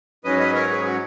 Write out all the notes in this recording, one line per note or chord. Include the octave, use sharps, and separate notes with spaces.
G#2 F#3 C#4 B4 D#5
B4 D#5
A#4 C#5
G#4 B4
F#4